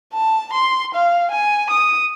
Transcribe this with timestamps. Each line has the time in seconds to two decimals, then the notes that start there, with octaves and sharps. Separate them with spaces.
0.13 A5
0.53 C6
0.94 F5
1.31 G#5
1.70 D#6